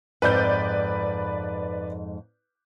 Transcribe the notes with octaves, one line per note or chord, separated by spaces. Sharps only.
F2 G#2 G#3 B4 D5 G6